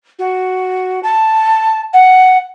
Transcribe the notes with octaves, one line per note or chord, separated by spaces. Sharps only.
F#4
A5
F#5